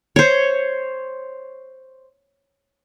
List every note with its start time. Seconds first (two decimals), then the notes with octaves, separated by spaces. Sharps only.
0.16 C5 C#5